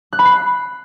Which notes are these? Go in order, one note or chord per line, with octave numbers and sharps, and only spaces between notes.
F#6
B5
C7